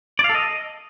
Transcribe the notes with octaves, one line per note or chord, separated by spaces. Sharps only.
D5
F5
A4
D#5